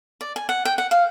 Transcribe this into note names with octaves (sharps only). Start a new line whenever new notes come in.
D5
G#5
F#5
G5
F#5
F5